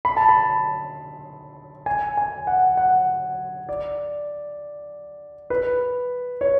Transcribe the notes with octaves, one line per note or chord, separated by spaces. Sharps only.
B5
A5
B5
G#5
G#5
F#5
F#5
D5
B4
C#5